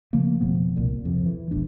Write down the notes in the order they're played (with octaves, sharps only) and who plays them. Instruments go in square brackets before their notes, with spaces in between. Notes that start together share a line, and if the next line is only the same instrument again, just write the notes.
[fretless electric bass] C#3 F3 A3 A#3
F1 B2 F3 B3
C2 A#2
F2 C3
E3
E1 A#1 E2 D4